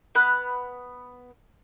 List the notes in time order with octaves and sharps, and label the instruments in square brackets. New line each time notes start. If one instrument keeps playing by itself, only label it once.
[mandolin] B3 B5 F#6